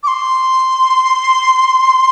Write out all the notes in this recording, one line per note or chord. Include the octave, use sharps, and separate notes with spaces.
D6
C6